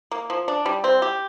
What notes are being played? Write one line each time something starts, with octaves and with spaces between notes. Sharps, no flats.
A#3
F3
D4
G3
C4
G4